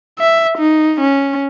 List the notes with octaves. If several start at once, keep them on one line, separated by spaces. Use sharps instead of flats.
E5
D#4
C#4